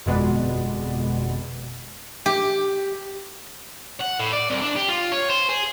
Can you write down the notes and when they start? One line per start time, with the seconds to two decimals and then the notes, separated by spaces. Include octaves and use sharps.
0.06 G1 F2 B2 G#3 B3 D5
2.26 G4
4.00 F#5
4.19 A2
4.33 D5
4.50 C2
4.62 D4
4.76 G4
4.88 F4
5.12 C#5
5.30 C5
5.49 G#4